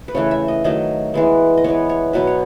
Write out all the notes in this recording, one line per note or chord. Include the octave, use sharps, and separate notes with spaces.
B4
C#3 E3 A3 C#5
E5
D#5
D#3 F#3 A3 D#5
E3 G#3 B3
D#5
E3 B3 C#5
C#5
B2 F#3 B3 B4
C#5